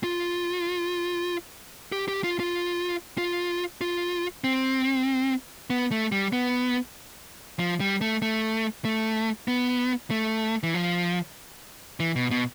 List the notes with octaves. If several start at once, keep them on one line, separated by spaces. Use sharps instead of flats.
F4
G4
G4
F4
F4
F4
F4
C4
B3
A3
G3
B3
F3
G3
A3
A3
A3
B3
A3
E3
F3
E3
B2
B2